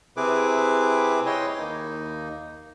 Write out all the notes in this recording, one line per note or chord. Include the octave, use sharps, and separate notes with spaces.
C3 C4 E4 G#4 B4 D6
E4 C#5 D#5 G5 C6
D#2 A#3 D#4